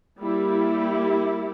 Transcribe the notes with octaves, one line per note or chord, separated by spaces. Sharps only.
G3 A#3 E4 G4